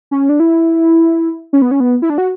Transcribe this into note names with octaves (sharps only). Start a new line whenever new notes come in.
C#4
D4
E4
C#4
B3
C#4
B3
E4
D4
F#4